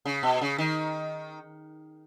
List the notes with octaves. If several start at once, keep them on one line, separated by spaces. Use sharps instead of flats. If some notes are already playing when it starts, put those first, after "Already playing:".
C#3
B2
C#3
D#3